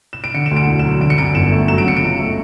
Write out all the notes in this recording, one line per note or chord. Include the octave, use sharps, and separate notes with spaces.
E7
D7
D3 C#7
E7
D2
D7
E1
E7
F#3
D3 D7
C#7
F#2 D7
G1 E7
A3
F#3 E7
D7
C#3 C#7
D7
C#2
A3